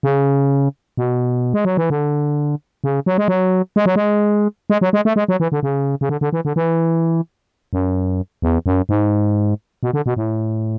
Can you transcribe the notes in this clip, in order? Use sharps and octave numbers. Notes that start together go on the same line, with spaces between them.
C#3
B2
G#3
F#3
E3
D3
C#3
F#3
G#3
F#3
G#3
F#3
G#3
G#3
F#3
G#3
A3
G#3
F#3
E3
D3
C#3
C#3
D3
D3
E3
D3
E3
F#2
E2
F#2
G#2
B2
D3
B2
A2